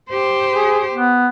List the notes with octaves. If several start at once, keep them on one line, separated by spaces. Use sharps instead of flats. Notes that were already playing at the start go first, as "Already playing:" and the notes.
G4 C5
G#4
B3